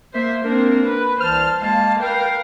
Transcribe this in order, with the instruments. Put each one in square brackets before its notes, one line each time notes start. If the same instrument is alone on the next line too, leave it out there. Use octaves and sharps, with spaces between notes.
[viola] A#3 C5 [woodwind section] E5
[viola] A#3 C4 [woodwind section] D4 A#4
[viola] B4
[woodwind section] C2 E3 F6 [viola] C5 A5
[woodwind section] G#3 A#3 [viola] F5 A5
[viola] A#4 F5 [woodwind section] B4 G5